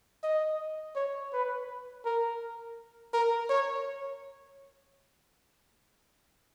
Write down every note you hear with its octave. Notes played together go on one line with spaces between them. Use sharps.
D#5
C#5
B4
A#4
A#4
C#5